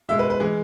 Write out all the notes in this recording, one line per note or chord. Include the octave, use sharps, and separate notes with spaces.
B2 G#3 E5
B4
B4
E3 G#3 G#4